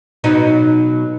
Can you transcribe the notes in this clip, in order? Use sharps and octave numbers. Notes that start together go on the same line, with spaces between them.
B2 F#3 D#4